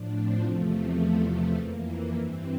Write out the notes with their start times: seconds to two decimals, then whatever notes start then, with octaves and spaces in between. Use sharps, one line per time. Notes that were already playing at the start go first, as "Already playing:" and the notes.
Already playing: A2 F3 D4
0.14 C4
0.42 E2 C3 F3 A3
0.99 E2 C3 F3
1.56 F2 E3 A#3
1.85 A#3
2.13 G2 E3 C4